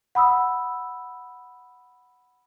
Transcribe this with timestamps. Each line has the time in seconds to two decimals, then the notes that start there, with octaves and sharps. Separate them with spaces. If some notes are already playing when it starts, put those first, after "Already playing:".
0.15 F#5 B5 D#6 E6